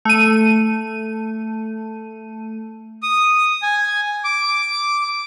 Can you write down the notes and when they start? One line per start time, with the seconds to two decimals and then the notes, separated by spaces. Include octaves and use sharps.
0.05 A3 D#7
3.03 D#6
3.62 G#5
4.24 D6